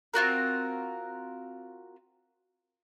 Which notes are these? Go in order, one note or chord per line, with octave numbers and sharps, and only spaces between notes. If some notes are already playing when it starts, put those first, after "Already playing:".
C4 F4 F#4 A#4